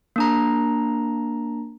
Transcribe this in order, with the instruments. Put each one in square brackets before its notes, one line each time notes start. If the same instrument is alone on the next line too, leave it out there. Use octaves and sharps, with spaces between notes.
[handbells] A#3 D4 A#5